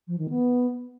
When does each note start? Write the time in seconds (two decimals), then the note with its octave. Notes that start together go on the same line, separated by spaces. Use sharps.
0.08 F3
0.19 D#3
0.30 B3